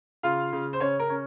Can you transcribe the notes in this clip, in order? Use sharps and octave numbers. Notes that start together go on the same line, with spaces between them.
C#3 F4 F5
C#3
C5
C#3 C#4 C#5
A#4
C#4